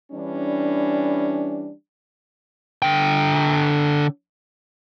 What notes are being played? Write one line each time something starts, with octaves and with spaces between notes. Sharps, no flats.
E3 G3 C#4 D4
D3 G5